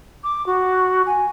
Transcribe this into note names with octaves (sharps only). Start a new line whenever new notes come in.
D6
F#4
G#5